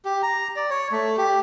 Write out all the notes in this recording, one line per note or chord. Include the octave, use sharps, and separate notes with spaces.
G4
A#5
D5
C#5
A3
G4